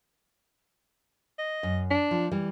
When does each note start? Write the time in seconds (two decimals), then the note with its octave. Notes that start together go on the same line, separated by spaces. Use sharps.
1.39 D#5
1.63 F#2
1.91 D4
2.11 F3
2.31 E3 G3